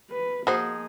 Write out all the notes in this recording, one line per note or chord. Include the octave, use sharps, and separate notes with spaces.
B4
F3 A#3 D#4 F#4 G#4 C5